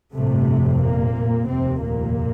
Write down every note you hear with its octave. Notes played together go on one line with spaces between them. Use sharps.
G1 F2 A2 C3 A3
A#2 A#3
F1 D#2 C3 C4
A#2 A#3